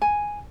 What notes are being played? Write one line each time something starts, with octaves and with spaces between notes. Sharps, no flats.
G#5